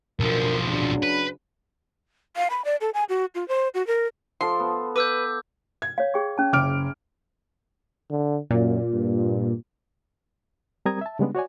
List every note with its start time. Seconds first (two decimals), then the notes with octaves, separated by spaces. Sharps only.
0.20 B1 B2 D3 F3 A#4
0.67 C#3 F#3 D4
1.03 B4
2.36 F5
2.50 B5
2.65 D5
2.81 A4
2.94 G#5
3.09 F#4
3.35 F4
3.48 C5
3.74 F#4
3.87 A#4
4.41 F3 A4 C6
4.60 B3
4.96 B4 D6 E6 G6
5.82 G#6
5.98 C#5 F5
6.14 G#4 G5 C#6
6.38 C#4 A5
6.53 F#1 D6 F6 D7
8.10 D3
8.51 F#2 A#2
8.93 G2
10.86 G3 C4 A#4 A#5 D#6 G#6
11.01 E5 A5
11.19 C#3 G3 G#3 B3 D4
11.35 F#4 C#5 D5 G#5